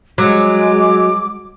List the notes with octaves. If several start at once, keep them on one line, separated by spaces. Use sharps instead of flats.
F#3 G#3 D6